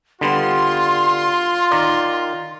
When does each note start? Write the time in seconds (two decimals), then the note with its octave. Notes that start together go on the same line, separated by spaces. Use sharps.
0.21 D3 G3 B3 F4 C6
1.71 D#3 A#4 D5